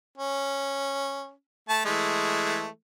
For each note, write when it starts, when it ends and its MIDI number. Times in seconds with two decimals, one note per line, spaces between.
0.18 1.32 61
1.69 1.81 57
1.69 1.81 81
1.85 2.68 52
1.85 2.68 56
1.85 2.68 57